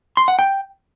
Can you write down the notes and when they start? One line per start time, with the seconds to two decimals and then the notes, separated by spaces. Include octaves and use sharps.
0.17 C6
0.28 F#5
0.39 G5